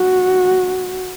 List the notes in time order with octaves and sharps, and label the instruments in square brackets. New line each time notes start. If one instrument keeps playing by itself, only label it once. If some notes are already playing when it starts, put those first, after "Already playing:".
Already playing: [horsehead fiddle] F#4